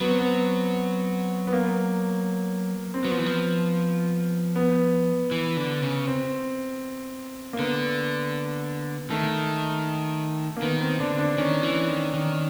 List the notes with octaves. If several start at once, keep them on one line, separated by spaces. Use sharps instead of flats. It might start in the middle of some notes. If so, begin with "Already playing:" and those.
F#3 B3
C4
B3
B3
A#3
C4
F#3 B3
F3
E3
F3
B3
E3
D3
C#3
C4
A#3
D3 B3
D#3 A3
A#3
D#3 B3
C4
D3 D4
D4
D#3 C#4
E3
D#3
D#3